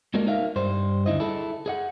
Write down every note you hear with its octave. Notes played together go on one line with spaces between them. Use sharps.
G#3 A#3 D4 F#4 A#4
D#4 A#4 E5 F5
G2 G3 C5
D2 D4 E4 D#5
E4 G#4 A4
G#4 D#5 F#5